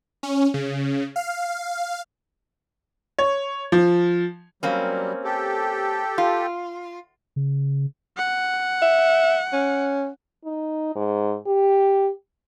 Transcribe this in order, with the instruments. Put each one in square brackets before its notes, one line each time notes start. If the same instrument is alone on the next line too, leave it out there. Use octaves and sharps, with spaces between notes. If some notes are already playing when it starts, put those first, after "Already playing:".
[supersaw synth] C#4
C#3
F5
[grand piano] C#5
F3
[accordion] F#3 G3 [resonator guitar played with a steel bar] A#3 C4 C#4
[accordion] G4 A4
[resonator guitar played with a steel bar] F4
[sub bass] C#3
[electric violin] F#5
[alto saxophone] E5
C#4
[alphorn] D#4
G#2
G4